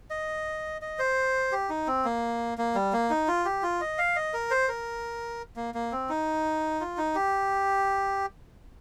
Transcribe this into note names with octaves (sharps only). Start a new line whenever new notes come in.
D#5
D#5
C5
G4
D#4
C4
A#3
A#3
G3
A#3
D#4
F4
G4
F4
D#5
F5
D#5
A#4
C5
A#4
A#3
A#3
C4
D#4
F4
D#4
G4